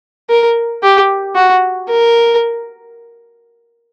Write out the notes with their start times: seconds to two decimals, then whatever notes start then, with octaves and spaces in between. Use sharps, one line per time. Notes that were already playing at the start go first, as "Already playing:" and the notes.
0.30 A#4
0.83 G4
1.36 F#4
1.89 A#4